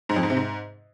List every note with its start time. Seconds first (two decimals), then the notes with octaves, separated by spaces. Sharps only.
0.09 G#2
0.16 F2
0.23 G#2
0.30 C3
0.37 G#2